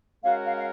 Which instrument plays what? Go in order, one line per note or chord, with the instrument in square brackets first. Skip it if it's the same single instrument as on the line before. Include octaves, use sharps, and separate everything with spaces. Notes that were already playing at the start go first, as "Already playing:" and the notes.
[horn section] G#3 C#4 F#4 A#4 [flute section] F5
[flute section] F5
F5